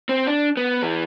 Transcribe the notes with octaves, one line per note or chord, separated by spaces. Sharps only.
C4
D4
B3
E2 E3